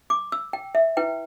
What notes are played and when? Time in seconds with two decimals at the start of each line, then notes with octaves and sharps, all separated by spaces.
0.10 D6
0.32 E6
0.53 G5
0.75 E5
0.97 E4 B4 G5